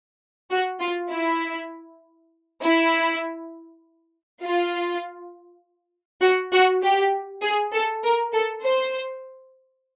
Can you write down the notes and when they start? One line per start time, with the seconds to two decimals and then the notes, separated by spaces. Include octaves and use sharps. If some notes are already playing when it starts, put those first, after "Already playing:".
0.51 F#4
0.80 F4
1.11 E4
2.62 E4
4.42 F4
6.22 F#4
6.53 F#4
6.83 G4
7.42 G#4
7.73 A4
8.03 A#4
8.33 A4
8.62 C5